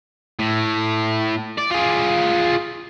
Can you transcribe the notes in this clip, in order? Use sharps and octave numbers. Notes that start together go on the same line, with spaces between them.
A2
D5
F4 G#4